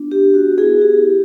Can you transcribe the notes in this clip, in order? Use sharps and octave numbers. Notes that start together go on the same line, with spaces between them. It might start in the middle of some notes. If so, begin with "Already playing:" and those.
Already playing: B3 D4 F4
G4
F#4
B3 E4 G#4
G4